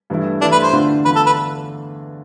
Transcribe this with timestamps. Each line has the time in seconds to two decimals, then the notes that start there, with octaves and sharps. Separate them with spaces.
0.10 G2 E3 A3 E4
0.41 G2 E3 A3 D4 E4
0.52 B4
0.63 C5
0.73 E2 D3 A3 D4 F4
1.05 E2 D3 A3 D4 F4 B4
1.16 A4
1.26 B4